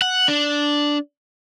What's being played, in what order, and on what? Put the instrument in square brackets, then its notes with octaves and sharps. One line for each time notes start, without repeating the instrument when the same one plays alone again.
[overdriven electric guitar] F#5
D4